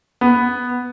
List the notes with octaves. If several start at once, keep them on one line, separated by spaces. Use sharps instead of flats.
B3